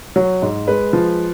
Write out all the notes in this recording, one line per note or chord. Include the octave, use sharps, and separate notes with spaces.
F#3
G#2
G#3 B4
F3